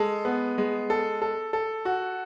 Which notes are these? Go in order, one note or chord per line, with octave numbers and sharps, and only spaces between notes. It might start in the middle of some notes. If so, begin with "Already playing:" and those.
Already playing: G#3 A4
B3
G#3
A4
A4
A4
F#4